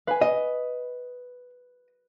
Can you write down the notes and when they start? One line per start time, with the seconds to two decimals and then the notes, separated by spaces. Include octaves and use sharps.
0.07 B4 F5 G#5
0.21 D#5